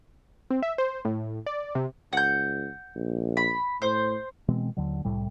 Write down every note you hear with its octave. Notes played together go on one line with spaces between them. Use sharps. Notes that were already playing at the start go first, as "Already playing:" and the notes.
C4
E5
C5
A2
D5
C3
C#2 F#5 G6
A#1
B5
A2 C5
B2 E3 G#3 C4
D#2 D3 F#3
C2 A2 G3